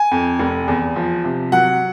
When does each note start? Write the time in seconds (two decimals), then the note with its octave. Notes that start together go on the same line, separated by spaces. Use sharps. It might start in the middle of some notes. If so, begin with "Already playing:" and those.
Already playing: G#5
0.11 F2
0.39 F1
0.68 E2
0.96 F3
1.25 C3
1.52 F#3 F#5